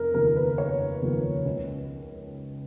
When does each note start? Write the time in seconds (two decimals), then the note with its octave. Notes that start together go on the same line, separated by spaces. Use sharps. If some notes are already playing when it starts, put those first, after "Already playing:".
Already playing: F1 A#4
0.14 D#2 C#3 F3 A#4
0.36 B4
0.58 F1 C#5
1.02 D#2 C#3 F3
1.46 C#2